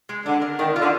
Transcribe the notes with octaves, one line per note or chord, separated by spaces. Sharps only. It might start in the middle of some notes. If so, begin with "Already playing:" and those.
G#3
D3 D4
A#4
D#3 D4
F4
D3